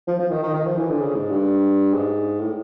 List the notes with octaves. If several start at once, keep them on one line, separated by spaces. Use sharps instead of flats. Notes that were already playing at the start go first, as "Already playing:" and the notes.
F3
F3
D#3
D#3
D#3
F3
E3
D3
C#3
G#2
G2
G#2
A2